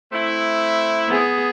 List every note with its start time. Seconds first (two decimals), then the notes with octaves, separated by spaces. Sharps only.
0.12 A3 C4 E4
1.08 B3 G#4